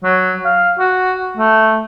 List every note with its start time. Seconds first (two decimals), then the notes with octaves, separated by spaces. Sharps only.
0.04 F#3
0.45 F5
0.79 F#4
1.37 A3